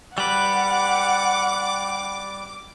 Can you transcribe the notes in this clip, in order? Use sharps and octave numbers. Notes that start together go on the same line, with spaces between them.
G3 B4 F#5 D6